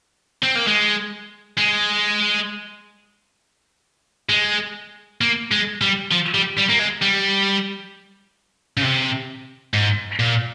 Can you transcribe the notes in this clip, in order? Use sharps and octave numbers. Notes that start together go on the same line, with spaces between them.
C4
A#3
G#3
G#3
G#3
A#3
G#3
G3
F3
G3
G3
A#3
G#3
G3
C#3
C3
G#2
A#2